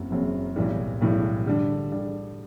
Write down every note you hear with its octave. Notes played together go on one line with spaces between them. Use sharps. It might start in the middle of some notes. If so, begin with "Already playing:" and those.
Already playing: F#1 F#2 F#3 C4
F#1 F#2 F#3 C4
B1 A2 E3 G3
B1 A2 E3 G3
D3 G3 D4
D3 G3 D4